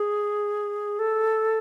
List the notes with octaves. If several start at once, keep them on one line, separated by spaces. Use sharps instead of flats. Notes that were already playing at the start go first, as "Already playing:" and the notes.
Already playing: G#4
A4